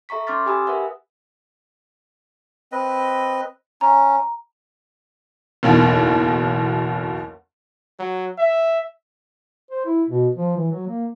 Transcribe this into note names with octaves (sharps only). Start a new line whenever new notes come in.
A4 E5 A#5 C#6 B6
C#4 C6 D6 F6 A6 B6
G4 G#5 B5 D#6 E6
A#4 B4 E5 F#5
C4 B4 D#5
C#4 A#5
F#1 B1 E2 B2
F#3
E5
C5
E4
B2
F3
E3
F#3
A#3